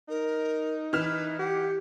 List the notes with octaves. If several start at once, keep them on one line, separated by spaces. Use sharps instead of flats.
D#4 A#4
E3 B4 F6 E7
G4 F#5